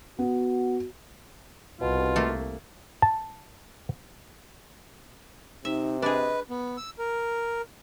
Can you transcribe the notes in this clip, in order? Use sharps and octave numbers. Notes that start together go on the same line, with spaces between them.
B3 F#4
C2 B2 F4
A3 A#3
A5
C3 D#4 E5
D4 G#4 B4 D#5
B3
E6
A#4